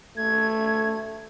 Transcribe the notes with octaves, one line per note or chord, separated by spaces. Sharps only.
A3 G#6